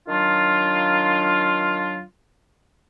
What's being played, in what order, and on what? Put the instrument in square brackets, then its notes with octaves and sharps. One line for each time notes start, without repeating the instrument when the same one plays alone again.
[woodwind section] D#3 F#3 D4 F4